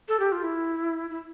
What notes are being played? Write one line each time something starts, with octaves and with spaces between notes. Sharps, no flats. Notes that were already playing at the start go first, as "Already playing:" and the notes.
A4
G4
F4
E4
E4